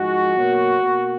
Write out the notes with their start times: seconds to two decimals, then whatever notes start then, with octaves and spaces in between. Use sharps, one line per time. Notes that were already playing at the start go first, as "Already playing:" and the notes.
Already playing: G#2 F3 G#3 F#4
0.36 B2 F#3 A#3
0.82 B2 A#3